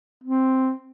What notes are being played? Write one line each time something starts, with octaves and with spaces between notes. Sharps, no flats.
C4